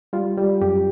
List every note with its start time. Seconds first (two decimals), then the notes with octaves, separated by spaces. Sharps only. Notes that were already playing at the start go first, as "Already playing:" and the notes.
0.13 G3 F4
0.37 G3
0.61 F#2 G4